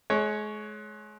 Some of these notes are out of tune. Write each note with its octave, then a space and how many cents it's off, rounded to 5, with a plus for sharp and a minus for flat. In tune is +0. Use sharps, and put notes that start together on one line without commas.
G#3 +35 C#5 +0